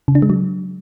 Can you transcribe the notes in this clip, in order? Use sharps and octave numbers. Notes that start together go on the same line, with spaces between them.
C#3
D4
G#3
F#3